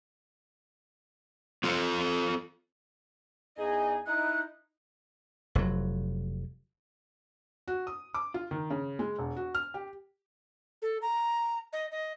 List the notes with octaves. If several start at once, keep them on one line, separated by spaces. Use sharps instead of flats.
C4 F4 A4
E2 D#4 G#4 D#5
D#4 E4 F#6
F1 F#3
F#4
D#6
D6
F4
D#3
C#3
G#3
E1
F#4
F6
G4
A4
A#5
D#5
D#5